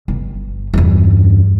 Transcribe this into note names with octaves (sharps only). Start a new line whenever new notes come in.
G1
E2 G2